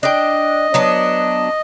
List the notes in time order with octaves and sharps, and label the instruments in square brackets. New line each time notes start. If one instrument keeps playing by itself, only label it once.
[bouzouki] D4 G5 [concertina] D#5
[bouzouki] F#3 B3 D4